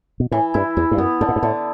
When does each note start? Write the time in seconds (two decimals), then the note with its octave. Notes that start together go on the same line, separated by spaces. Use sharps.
0.20 B2
0.31 A2 E3
0.54 G2 E4
0.77 E2 E4
0.91 G2
0.98 F#2 B3
1.21 G2 D3
1.29 A2
1.36 G2
1.42 A2 D3